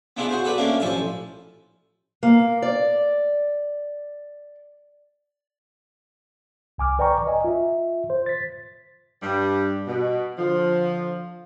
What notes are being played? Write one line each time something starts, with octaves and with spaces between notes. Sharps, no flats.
B3 D4 E4 F4 G#4
F#4 G#4 C5
F#4 A4 B4 D5
A3 A#3 C#4 D4 D5 F5
A1 F3 A4 G#5 A5
A#3
D5
C2 G#5 D6 F6
B4 D5 G5 A#5 C#6
D#5 G#5
F4 E5
C5
A6 B6
G2 G3
B2
D3 F3